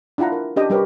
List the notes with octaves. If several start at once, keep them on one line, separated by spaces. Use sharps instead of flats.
D4 E4 F4 F#5 A#5
A#4
C#4 D4 G4 D#5 G5
G3 G4 A#4 B4 C#5